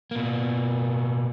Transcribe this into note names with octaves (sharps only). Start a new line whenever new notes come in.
B2 A#3